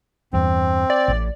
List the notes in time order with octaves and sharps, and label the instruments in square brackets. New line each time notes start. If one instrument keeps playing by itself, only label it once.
[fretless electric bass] E2 G2 [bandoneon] C4
[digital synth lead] D5
[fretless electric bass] A1 A2